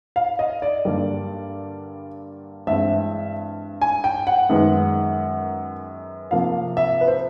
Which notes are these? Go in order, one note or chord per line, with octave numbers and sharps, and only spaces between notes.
F5
D#5
D5
G2 D3 G3 A#3
G2 E3 G#3 C4 E5
G#5
G5
F#5
F#2 D#3 G#3 B3
C3 F3 A#3 F5
E5
B4
C5